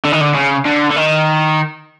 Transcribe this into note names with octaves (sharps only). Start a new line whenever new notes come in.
D3
D#3
D3
C#3
D3
D3
D#3